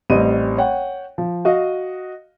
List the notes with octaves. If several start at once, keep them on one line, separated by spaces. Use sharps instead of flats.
A1 G3 C4 D#5 D#7
C#5 F#5 G5
F3
F#4 D#5 F5